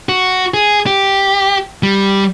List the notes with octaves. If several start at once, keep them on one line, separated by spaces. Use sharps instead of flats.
F#4
G#4
G4
G3